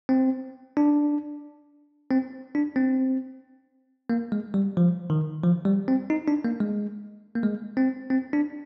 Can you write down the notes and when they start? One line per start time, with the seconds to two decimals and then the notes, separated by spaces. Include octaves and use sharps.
0.09 C4
0.77 D4
2.10 C4
2.55 D4
2.76 C4
4.10 A#3
4.32 G#3
4.54 G3
4.77 F3
5.10 D#3
5.44 F3
5.65 G3
5.88 C4
6.10 D#4
6.28 D4
6.44 A#3
6.60 G#3
7.35 A#3
7.43 G#3
7.77 C4
8.10 C4
8.33 D4